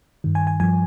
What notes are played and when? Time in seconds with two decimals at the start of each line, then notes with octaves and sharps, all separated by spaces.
0.24 G2 D#3
0.35 G#5
0.47 G#5
0.60 G2 F3 G#5